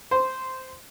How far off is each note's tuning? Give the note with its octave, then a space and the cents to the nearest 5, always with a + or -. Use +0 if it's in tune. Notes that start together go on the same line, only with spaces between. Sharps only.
C5 -10